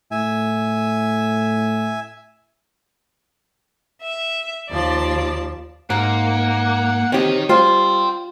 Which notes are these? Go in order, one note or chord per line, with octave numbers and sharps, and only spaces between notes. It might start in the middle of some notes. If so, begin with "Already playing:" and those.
A2 E5 G#5
E5
D#2 F3 D5 A5
G#2 A#3 F#5
D#3 C4 G4 C#5 D#5
G3 F4 C5 G5 C6